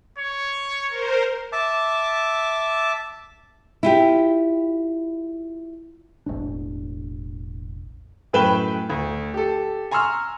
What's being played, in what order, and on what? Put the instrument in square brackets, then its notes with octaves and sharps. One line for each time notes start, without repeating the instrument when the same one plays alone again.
[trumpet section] C#5
[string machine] A#4 C5
[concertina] E5 A5 D6
[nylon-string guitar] E4 F4 G4
[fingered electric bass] E1 A1 D4
[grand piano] F#2 A2 B4 G5 E7 G7
D2
G4 A4
G#5 A#5 C6 C#6 E6 F6